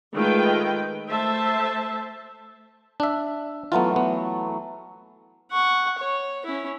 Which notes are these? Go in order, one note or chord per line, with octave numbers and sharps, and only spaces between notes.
D#3 G#3 A3 F4 B4 G5
A3 C5 E5 A5
D4 E5
E3 F#3 A3 B3 F4
B3
F#5 C#6
C#5
C#4 E4